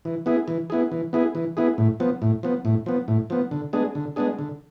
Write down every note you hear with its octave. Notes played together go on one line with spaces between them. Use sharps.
E3
B3 E4 G#4
E3
B3 E4 G#4
E3
B3 E4 G#4
E3
B3 E4 G#4
A2
F3 B3
A2
F3 B3
A2
F3 B3
A2
F3 B3
D3
G#3 B3 D4 G#4
D3
G#3 B3 D4 G#4
D3